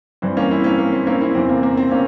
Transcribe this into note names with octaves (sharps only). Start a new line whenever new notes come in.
G2 E3 C4
A#3 C#4
C4 E4
A#3 C#4
A#3
C4
A#3 C#4
C4 E4
E2 C3 E3 C4
A#3
A#3
C4
A#3 C#4